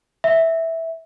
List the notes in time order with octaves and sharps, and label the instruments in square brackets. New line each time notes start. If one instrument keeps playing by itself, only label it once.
[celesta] E5